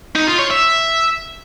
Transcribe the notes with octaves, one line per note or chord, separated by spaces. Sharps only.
D#4
F4
C#5
E5